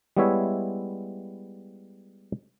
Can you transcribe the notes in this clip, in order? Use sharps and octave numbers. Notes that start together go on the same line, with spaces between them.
G3 G#3 B3 E4 C#5 E5